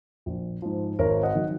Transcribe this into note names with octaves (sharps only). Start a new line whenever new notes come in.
A#1
G#2 F3
G#1 A#4 C#5
D#5 F#5
D#3 F#3